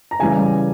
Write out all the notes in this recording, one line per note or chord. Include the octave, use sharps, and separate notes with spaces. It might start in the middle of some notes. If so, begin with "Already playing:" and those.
A#5
C#3 E3 G3 G#5